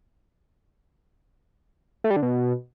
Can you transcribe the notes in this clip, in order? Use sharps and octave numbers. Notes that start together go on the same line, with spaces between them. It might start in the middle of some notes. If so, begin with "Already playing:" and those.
A3
G3
D3
B2